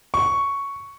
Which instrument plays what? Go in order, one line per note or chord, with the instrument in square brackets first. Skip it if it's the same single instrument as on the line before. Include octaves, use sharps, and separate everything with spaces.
[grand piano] C#6